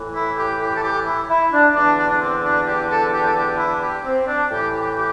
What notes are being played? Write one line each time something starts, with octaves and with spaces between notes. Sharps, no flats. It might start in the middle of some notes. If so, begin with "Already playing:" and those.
Already playing: A2 E3
E4
G4
G4
A4
G4
E4
E4
D4
E2 D3 D4
D4
D4
C4
D4
G4
A4
A4
G4
A4
G4
E4
G4
C4
D4
A2 E3 G4
G4
G4